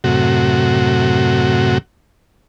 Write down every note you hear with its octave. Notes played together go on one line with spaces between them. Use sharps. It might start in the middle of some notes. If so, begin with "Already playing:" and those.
F#2 A2 C3 F#4